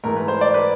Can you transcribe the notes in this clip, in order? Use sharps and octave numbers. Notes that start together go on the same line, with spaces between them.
G#2 E3 A3 A#4
B4
C5
D5
B4